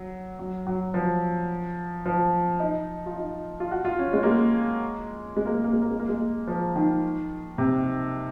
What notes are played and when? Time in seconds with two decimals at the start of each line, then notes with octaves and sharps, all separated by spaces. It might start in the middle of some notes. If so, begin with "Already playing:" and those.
Already playing: F#3
0.39 F#3
0.67 F#3
0.94 F3
2.06 F3
2.60 D#4
3.06 F4
3.16 D#4
3.60 F4
3.71 F#4
3.85 F4
3.99 C#4
4.13 G#3
4.23 A#3
4.26 G#3
5.37 G#3
5.46 A#3
5.55 G#3
5.64 A#3
5.73 G#3
5.82 A#3
5.91 G#3
6.00 A#3
6.09 G#3
6.48 F3
6.76 D#3
7.58 C3